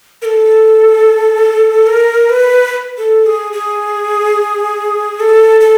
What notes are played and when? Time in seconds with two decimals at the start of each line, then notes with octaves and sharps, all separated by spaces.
0.22 A#4
0.25 A4
1.87 A#4
2.29 B4
2.98 A4
3.26 G#4
3.53 G#4
5.20 A4
5.60 A4